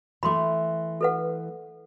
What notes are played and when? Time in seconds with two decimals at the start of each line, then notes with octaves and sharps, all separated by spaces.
0.23 E3 A3 B5 C6 D6
1.01 A4 B4 F#5